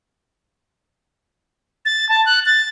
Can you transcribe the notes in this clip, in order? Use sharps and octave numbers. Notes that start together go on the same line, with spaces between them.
A6
A5
F#6
A6